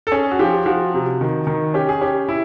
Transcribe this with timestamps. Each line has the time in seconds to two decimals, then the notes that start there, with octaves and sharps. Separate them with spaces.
0.07 A4
0.12 C#4 G#4
0.31 F#4
0.39 F3 G4
0.66 F3 F#4
0.94 C3
1.21 D#3
1.47 D#3
1.74 C#4 G4
1.89 G#4
2.01 C#4 G4
2.29 E4